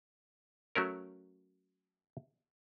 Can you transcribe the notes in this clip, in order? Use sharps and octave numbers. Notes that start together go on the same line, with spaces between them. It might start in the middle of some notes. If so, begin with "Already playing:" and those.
F#3 A3 C#4 A#4